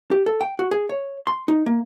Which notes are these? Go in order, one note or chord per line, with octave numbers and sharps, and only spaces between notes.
G4
A4
G5
F#4
G#4
C#5
C6
D#4
A#3